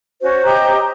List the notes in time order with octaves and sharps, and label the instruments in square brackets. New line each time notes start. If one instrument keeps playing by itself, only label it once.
[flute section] C#4 F#4 [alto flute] C5
[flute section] G4 D#5 A#5